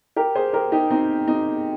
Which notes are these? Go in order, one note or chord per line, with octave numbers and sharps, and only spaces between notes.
G4 A#4
G#4 C5
G4 A#4
D#4 G4
C4 D#4
C4 D#4